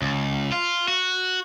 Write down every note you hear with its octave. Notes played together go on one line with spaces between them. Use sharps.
C#2
F4
F#4